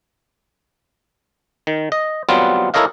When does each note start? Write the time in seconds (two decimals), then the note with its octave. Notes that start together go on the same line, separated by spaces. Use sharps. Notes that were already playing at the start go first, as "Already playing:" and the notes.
1.67 D#3
1.92 D#5
2.29 F#3 G3 B3 C4 F4
2.74 E4 A4 A#4 C#5 D#5 F5